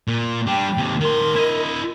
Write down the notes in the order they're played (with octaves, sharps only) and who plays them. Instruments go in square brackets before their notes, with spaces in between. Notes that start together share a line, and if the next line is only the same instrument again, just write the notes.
[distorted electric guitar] A#2
[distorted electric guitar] G3 D4 [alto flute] G5
[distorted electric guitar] D#2 C3
[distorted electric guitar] D#3 C6 [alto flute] A#4
[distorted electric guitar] E4 D#5